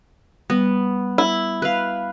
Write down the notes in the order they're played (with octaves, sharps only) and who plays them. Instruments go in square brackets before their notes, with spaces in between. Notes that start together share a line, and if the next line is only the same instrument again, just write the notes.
[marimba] G3 [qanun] B3
[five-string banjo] E4
[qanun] B4 F5